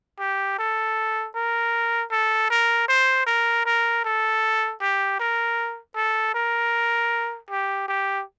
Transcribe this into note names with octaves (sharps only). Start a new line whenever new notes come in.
G4
A4
A#4
A4
A#4
C5
A#4
A#4
A4
G4
A#4
A4
A#4
G4
G4